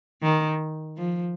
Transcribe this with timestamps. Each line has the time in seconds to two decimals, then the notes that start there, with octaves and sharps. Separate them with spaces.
0.23 D#3
0.98 F3